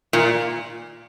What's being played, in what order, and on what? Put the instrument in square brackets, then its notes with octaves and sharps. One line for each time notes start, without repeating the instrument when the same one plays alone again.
[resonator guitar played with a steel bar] A#2